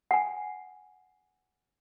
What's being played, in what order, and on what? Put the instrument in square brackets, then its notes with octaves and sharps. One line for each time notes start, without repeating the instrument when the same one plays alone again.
[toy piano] F#5 G#5